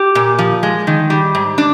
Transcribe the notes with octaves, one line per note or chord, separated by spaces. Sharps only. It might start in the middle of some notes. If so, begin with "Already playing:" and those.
Already playing: G4
A#2
F3
G#3
D#3
G3
G#2
D4